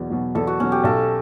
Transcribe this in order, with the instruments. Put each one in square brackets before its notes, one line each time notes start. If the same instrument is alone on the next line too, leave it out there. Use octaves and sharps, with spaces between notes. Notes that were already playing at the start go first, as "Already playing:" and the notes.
Already playing: [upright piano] E2 B2 F#3
B2 F#3
[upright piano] E2 [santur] A4
[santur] F#4
[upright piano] B2 F#3 [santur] C#4
[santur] G4
[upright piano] B1 [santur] A4